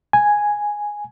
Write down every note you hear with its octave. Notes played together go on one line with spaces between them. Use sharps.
G#5